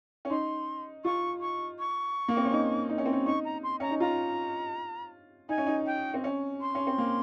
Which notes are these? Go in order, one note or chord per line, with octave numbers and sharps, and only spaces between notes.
C#4
D#4 C6
F4 C#6
C#6
C#6
A#3
C4
C#4
D#4
D#4
C#4
C4
C#4
D#4 C#6
A#5
C6
C#4 A#5
D#4
F4 A#5
D#4 G#5
C#4
D#4
G5
C4
C#4
C6
C#4
C4
A#3